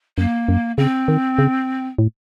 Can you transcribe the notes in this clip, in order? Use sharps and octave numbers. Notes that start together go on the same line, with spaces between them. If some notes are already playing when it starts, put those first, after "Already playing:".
F#2 A#3
F#2
C#3 C4
D#3
C#3
A2